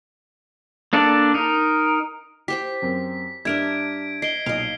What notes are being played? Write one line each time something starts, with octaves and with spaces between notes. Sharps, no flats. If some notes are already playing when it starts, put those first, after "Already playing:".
A#3 D4 A4 D5
D#4 A#4
G4 C5 G5 B6
F#2 C4 A#4
G2 D4 A#4 E5 G#6 D7
D#5 C7 D7 G7
B1 A#2 D#5 F5